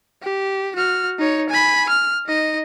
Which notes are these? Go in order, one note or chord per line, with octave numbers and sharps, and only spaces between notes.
G4
F#4 F6
D#4 C#5
G#5 B5
F6
D#4 D#5